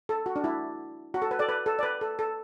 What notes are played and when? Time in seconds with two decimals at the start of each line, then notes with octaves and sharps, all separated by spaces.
0.09 A4
0.26 F#4
0.36 D4
0.44 E4
1.14 F#4
1.22 A4
1.31 B4
1.39 A4 D5
1.49 B4
1.66 A4
1.79 D5
1.83 B4
2.01 A4
2.19 A4